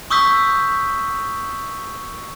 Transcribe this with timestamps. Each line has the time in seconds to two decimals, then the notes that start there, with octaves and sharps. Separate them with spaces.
0.10 C#6 D#6 E6 G6 B6